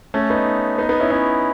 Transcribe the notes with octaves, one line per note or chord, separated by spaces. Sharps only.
A3 C#4
B3 D#4
B3 D#4
B3 D#4
C#4 E4
C#4 E4